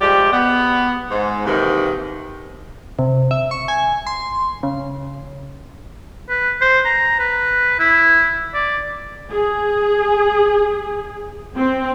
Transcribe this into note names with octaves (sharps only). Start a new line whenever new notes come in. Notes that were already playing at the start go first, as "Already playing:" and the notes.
F3 G3 G#3 G4
B3
G#2
D#2 G#2 C3 D#3 E3
C3
E5
C#6
G#5
C6
C#3
B4
C5
A#5
B4
E4
D5
G#4
C4